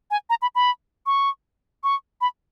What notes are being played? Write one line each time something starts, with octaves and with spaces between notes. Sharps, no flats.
G#5
A#5
B5
B5
C#6
C#6
B5